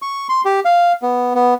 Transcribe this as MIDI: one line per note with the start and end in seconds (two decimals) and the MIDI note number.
0.02 0.27 85
0.29 0.41 84
0.45 0.60 67
0.65 0.92 77
1.02 1.33 59
1.35 1.54 59